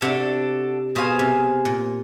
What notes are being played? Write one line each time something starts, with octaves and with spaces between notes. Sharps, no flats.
C3 D4 F#4 A4
B2 G#4 C5 F5 G#5
C3
A#2